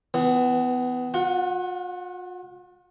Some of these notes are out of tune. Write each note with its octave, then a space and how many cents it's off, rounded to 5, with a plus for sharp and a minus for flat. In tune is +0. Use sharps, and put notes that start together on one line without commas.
E3 +0 B3 +25
F4 +45 F#5 +0